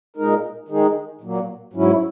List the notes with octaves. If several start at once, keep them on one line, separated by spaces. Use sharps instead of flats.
A#2 G#3 D#4 A#4
D#3 G#3 D#4 G#4
A#2 F#3 A#3
G#2 F#3 C#4 E4